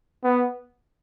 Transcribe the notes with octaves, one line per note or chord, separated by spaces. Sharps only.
B3